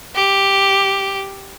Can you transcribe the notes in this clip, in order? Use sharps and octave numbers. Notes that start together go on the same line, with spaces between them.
G4